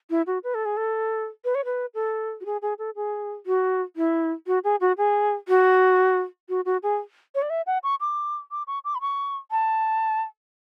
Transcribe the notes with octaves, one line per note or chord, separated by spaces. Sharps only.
E4
F#4
B4
A4
G#4
A4
B4
C#5
B4
A4
F#4
G#4
G#4
A4
G#4
F#4
E4
F#4
G#4
F#4
G#4
F#4
F#4
F#4
G#4
C#5
D5
E5
F#5
C#6
D6
D6
C#6
D6
B5
C#6
A5